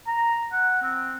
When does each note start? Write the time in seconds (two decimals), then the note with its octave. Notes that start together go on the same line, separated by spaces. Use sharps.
0.07 A#5
0.52 F#5
0.82 C4